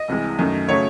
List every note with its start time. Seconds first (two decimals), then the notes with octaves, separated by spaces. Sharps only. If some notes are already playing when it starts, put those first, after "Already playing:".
Already playing: D#5
0.08 C2 C3 E3 G#3
0.39 F#2 D#3 A3
0.69 C#3 F#3 A3 C#5